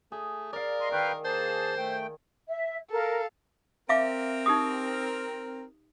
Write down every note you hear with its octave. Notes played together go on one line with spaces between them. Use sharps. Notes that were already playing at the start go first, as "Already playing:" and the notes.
A3 G#4
A#4 D5 F5
D#5 C6
D#3 B4 F5 G5
A#3 G#4 C5 A5
A3 G5
E5
A4 A#4 F5
C4 A#4 E5 F5 D6
D#4 G4 D#6